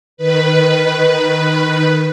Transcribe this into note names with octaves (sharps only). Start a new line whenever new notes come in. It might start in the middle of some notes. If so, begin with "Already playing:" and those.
D#3 B4